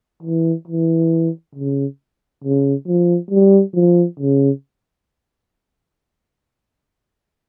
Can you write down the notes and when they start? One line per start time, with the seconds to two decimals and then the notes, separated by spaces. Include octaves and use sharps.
0.23 E3
0.68 E3
1.55 C#3
2.44 C#3
2.87 F3
3.31 G3
3.75 F3
4.20 C#3